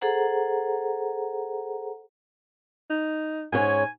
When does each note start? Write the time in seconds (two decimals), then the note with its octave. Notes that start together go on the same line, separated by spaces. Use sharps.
0.01 G#4 A4 C5 F#5 A#5
2.90 D#4
3.53 G#2 C#4 C#5 G#5